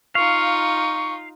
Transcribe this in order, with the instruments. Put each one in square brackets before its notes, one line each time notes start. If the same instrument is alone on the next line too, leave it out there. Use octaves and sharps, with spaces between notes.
[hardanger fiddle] D#4 F4 [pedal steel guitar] F5 [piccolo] C#6